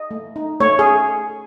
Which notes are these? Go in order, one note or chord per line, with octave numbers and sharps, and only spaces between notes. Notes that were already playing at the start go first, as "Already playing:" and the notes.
Already playing: D#5
A3
D#4
A3 C#5
G#4